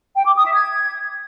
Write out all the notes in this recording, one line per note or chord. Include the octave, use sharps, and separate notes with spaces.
G5
D6
D#6
E5
G#6